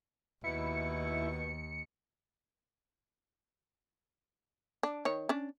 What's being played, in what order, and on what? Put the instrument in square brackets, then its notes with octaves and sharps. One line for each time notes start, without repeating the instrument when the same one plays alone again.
[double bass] D#2 [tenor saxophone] B2 [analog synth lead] E4 [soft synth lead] C#7
[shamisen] D4
D#3 C#5
C#4 D4